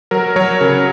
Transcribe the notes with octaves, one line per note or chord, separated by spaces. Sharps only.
F#3 A#4
F#3 C#5
C#3 A#4